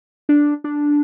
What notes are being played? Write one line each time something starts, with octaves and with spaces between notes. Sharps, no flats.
D4
D4